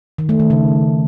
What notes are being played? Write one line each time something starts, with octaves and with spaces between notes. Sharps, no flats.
D#3
A3
D#3
C#3